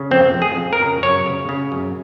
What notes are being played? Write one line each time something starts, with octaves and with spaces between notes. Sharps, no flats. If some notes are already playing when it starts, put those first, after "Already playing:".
Already playing: C#3
F2 C4
F2
G#4
F2
A#4
C#3
F#2 C#5
C#3
C#3
F#2